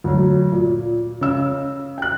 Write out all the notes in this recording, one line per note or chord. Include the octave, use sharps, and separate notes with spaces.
D2 F#3
A#2
C#3 E6
G5 F#6